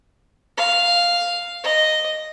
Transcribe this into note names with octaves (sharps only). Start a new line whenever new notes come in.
F5
D#5